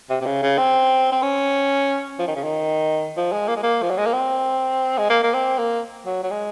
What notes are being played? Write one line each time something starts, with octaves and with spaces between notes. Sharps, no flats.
C3
C3
C#3
C#3
C4
C4
C#4
F3
D#3
C#3
D#3
F3
G#3
A#3
G#3
A#3
F3
F#3
G#3
A#3
C4
G#3
A#3
A#3
C4
A#3
F#3
F#3
G#3